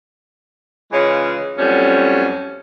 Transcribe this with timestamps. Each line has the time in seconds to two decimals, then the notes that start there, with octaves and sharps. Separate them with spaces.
0.92 C#3 E3 G#3 C#4 F4
1.58 F2 A2 F#3 G3 C#4